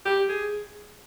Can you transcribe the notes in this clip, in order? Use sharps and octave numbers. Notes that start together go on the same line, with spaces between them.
G4
G#4